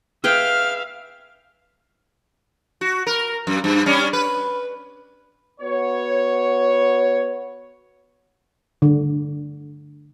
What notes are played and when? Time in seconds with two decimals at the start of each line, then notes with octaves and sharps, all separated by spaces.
0.24 G#4 B4 E5 F5 G5 F6
2.81 F#4
3.07 A#4
3.47 F#2
3.64 G2
3.86 G3 C#4 D4
4.13 B4
5.60 B3 F#4 C#5
8.82 D3